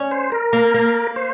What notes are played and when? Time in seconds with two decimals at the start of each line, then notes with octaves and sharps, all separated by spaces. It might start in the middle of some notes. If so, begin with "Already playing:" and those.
Already playing: C#4
0.11 C5
0.32 A#4
0.53 A#3
0.74 A#3
1.16 C5